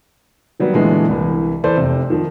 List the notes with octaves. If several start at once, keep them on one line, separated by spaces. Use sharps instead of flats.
D#3 F#3 G3 B3
A#2 D3 E3 G#3 A3 B3
C2 E3
E3 A4 B4 C5 D5
F1 C3
D#3 F3